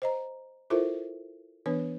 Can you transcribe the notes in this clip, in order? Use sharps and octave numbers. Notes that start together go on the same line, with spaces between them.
C5 D#5 A#5
E4 F4 A4 A#4 C5 E5
E3 B3 D4 B4 C#5